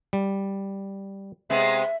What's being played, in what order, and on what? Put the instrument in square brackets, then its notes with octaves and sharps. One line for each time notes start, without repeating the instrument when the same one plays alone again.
[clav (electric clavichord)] G3
[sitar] C3 G#3 B3 [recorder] E5